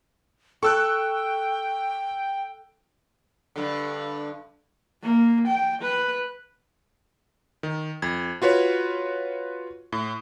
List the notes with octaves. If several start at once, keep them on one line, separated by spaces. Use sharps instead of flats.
A4 G5 C#6 E6 F#6
G2 D3
A#3
G5
B4
D#3
F2 G#6
F4 F#4 B4 C#5
A2